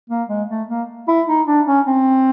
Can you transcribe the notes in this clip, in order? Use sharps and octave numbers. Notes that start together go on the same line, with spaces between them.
A#3
G#3
A3
A#3
E4
D#4
D4
C#4
C4